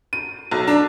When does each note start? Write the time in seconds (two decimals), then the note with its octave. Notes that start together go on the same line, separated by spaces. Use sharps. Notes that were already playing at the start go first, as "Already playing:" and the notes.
0.13 D#7
0.51 B1
0.68 D4